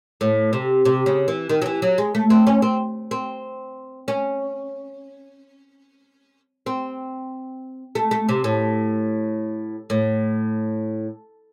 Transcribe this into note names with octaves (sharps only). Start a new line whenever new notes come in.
A2
C3
C3
C#3
E3
D#3
F#3
E3
F#3
G#3
A3
C4
C#4
C4
C4
C#4
C4
A3
A3
C3
A2
A2